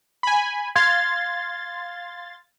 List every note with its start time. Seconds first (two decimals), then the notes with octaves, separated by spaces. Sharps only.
0.23 G#5 B5
0.76 F5 C6 G#6 A6